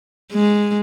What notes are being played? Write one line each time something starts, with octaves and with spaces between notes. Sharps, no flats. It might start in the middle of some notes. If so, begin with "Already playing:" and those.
G#3